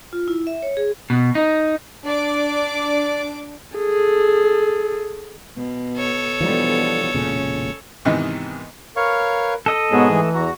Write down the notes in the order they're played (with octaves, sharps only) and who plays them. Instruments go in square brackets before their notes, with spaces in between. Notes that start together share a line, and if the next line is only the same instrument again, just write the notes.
[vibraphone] F4
E4
E5
C#5
G#4
[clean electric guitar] B2
D#4
[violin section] D4 D6 [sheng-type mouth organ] D5
[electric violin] G#4 A4
[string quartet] B2
[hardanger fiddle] A4 C#5
[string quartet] B2 D3 [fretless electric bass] E3 F3 G3
[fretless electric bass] E1 A#2 C#3 [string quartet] C#4
[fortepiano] G#2 C3 D#3 E3 B3 D#4
[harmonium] A#4 B4 [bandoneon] C#5 F5 C#6
[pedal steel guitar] A4 D#5
[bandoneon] G#2 G#3 G#4 [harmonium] B2 C#5 [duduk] B3
[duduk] E3 [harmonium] A3
[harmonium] E2 A#5 [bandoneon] F#4